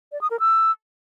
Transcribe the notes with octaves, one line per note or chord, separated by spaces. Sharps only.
D5
D#6
A#4
E6